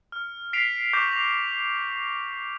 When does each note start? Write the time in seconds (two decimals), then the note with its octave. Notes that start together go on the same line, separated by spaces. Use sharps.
0.12 F6
0.53 B6 C7 D7 F7
0.93 C#6 D6 G6 A#6 E7
1.11 A#6 F7